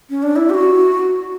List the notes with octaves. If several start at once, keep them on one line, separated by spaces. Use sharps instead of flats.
C#4
D4
E4
G4
F#4